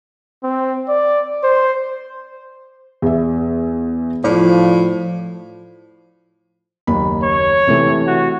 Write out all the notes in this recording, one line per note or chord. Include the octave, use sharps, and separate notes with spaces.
C4
D5
C5
E2 E5
A2 F3 D5
F#1 D#2 B5
C#5
C3 E3 A3
F#4